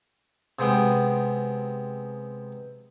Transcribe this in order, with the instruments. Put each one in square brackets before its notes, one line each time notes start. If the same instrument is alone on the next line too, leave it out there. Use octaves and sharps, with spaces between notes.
[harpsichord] C3 G#3 B3 G5